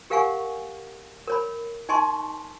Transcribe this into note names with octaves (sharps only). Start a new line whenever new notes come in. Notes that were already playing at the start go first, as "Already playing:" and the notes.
G4 A#4 F5 F#5 G#5 C#6
A#4 C#5 B5
D#4 D#5 G#5 A5 C6 C#6